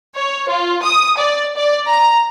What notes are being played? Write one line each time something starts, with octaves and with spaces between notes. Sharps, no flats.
C#5
F4
D#6
D5
D5
A#5